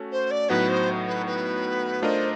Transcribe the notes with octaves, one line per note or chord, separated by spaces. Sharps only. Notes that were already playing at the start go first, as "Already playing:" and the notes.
Already playing: A3 C#4 F#4
C5
D5
A2 F#3 B3 D#4 F#4 B4
C5
B4
B4
A3 D4 F4 A#4 C5 D#5